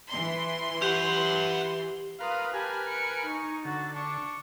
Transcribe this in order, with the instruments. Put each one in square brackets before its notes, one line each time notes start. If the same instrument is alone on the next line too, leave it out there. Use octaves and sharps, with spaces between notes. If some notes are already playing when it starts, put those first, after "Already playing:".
[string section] E3 C6
[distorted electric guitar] C#4 F#5 [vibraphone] G4
[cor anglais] F4 [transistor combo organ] A#4 B4 [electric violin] F5 D#6
[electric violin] G4 A5 [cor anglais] G#5
[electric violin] C#7 D7
D#4 C#6
[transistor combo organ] D3 [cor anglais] F#4 [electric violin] A6
[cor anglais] D4 [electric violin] C#6